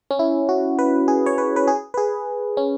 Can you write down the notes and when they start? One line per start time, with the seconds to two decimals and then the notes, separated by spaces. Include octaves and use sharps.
0.11 C#4
0.19 E4
0.49 F#4
0.79 B4
1.08 G#4
1.26 C#5
1.38 B4
1.56 B4
1.68 G#4
1.94 B4
1.97 G#4
2.57 C#4